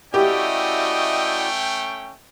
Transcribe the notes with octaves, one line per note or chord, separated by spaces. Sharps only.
A3 C#4 E4 F#4 G4 D5 D#5 G5